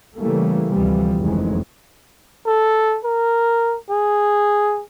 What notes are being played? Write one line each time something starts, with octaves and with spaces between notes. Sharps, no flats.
C#3 E3 G3 A3 A#3
D2 C3 E3 F3 G3
F#1 F2 D#3 E3 G#3
A4
A#4
G#4